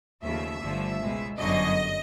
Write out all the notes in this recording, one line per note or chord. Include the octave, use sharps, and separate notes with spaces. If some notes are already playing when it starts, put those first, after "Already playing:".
D#2 C#3 F3 A3 E5
G1 G2 D3 F3 A3
C#2 B2 G#3
G1 F#2 D3 F#3 D#5